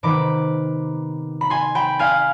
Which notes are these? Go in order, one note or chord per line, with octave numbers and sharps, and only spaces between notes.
C3 D#3 B3 B5 D6
B5
G#5 C6
G5 B5
F5 G#5